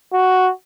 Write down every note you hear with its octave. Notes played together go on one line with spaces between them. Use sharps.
F#4